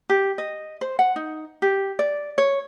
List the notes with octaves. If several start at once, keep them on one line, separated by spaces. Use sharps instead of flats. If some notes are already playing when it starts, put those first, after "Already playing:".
G4
D#5
C5
F#5
D#4
G4
D5
C#5